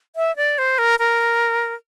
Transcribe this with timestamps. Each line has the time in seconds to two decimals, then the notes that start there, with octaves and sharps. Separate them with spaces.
0.16 E5
0.36 D5
0.58 C5
0.78 A#4
0.99 A#4